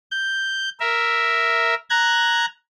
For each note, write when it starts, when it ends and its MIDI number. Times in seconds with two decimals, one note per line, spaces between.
0.11 0.69 91
0.80 1.75 70
0.80 1.75 76
1.90 2.46 82
1.90 2.46 90
1.90 2.46 92